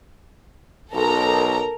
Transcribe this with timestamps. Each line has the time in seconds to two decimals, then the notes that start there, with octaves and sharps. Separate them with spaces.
0.92 B1 A4 A#4 A#5